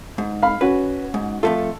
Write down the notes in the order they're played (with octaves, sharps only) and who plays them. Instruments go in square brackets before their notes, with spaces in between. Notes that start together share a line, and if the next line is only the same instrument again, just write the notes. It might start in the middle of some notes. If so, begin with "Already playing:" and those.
[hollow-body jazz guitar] G#2
[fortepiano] F5 B5
[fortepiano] C#4 F#4 [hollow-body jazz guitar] B4
[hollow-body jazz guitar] G#2
[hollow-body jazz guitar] F2 A3 F4 [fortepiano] A4